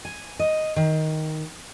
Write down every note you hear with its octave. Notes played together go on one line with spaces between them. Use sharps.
G#5
D#5
D#3